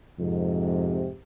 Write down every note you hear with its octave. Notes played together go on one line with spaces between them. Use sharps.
F2 G#2 C3